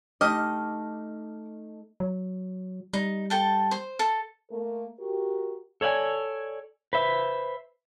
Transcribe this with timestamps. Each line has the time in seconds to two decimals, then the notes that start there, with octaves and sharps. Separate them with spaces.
0.21 A3 D#4 G4 D#5 D6 F6
2.00 F#3
2.93 G3 D#4
3.30 A4 G5 A5
3.71 C5
3.99 A4
4.51 A3 A#3 A#4
5.00 F#4 G4 A#4
5.81 A4 C#5 D5 F#5 G#5
6.93 B4 C5 E5